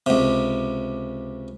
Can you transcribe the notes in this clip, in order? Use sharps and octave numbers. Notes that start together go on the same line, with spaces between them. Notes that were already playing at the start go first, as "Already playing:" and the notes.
C#2 C3